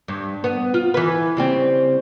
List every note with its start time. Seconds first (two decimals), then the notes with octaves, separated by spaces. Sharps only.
0.08 G2
0.44 B3
0.74 F4
0.94 E3 B4
1.37 C#3 G3 C4